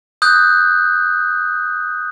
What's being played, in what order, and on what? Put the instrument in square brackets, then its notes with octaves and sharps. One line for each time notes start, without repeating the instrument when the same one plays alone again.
[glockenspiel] D#6 F#6 G6